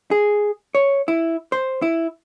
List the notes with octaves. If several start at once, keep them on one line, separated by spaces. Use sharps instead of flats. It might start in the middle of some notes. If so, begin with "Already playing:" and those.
G#4
C#5
E4
C5
E4